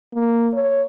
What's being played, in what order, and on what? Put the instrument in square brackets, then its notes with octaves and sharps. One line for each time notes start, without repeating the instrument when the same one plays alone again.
[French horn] A#3
C#5